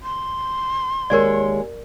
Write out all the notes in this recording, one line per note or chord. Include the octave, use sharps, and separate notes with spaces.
C6
D#2 G#3 A#4 C#5 D5